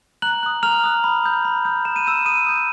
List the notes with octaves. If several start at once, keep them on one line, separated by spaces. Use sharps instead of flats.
A#5 F#6 F#7
D#6 F#6
A#5 F6 F7
D#6 F#6
B5
D#6 G6
B5
D#6 G6
B5 E7
D#7
D#6 E6 G6 E7
B5 D#6 D#7
D#6 G6